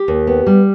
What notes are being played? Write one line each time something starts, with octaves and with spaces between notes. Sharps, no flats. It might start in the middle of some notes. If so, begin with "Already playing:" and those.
Already playing: G4
D#2
B3
G3